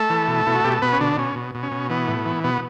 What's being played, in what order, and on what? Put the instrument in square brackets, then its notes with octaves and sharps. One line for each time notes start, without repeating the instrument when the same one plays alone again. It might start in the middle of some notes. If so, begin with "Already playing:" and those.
Already playing: [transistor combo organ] A3 A4
E3
B2
B2 E4
F#4
B2 G4
A4
B2 B3 B4
C#4
B2 D3 D4
B2 C#4
B2
B2
C#4
B2
E3 B3
A2
E3
B2 B3